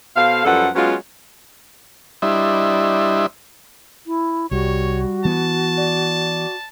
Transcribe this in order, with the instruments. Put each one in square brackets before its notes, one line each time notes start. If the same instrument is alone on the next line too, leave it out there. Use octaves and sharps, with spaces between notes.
[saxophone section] B2 A4 C5 F5
F#2 F3 G3 A4 B4 F#5
F#3 G#3 B3 C#4 F4
[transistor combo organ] G3 D4 E4 C5 D#5 E5
[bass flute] E4
[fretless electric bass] C2 [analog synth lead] G3 [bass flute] F#4 [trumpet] C#5
[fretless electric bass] E3 B3 [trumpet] A5
[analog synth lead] D5